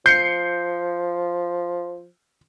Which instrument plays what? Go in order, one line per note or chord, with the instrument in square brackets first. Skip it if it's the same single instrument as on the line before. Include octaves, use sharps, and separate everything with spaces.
[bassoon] F3 [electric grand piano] G6 [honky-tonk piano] C7 C#7